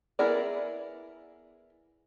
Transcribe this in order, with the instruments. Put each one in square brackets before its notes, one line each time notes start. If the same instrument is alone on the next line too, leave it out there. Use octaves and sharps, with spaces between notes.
[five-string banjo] B3 E4 G#4 A#4 D5